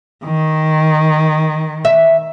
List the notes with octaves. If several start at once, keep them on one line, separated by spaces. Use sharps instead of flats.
D#3
E5